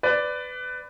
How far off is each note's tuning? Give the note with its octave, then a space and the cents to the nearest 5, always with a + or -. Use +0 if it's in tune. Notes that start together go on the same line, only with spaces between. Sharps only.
B4 +20 D5 +0